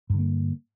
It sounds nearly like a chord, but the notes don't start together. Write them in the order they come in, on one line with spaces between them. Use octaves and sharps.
G2 D3 A#3